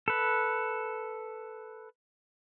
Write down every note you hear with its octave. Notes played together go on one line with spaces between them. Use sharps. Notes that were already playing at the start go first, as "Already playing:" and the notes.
A4 B4